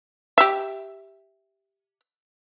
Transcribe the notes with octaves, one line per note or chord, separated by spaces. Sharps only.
G4 E5